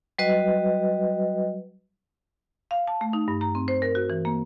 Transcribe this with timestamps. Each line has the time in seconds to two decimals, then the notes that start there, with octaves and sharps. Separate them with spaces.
0.18 F#3 G3 F#4 B4 D#5
2.71 F5
2.88 A5
3.01 A3
3.13 D#4
3.28 G2
3.41 A#5
3.55 C4
3.68 C5
3.82 A#4
3.95 F#4
4.10 E3
4.25 A#3